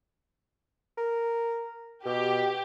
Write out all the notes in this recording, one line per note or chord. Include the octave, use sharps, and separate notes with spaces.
A#4
B2 G4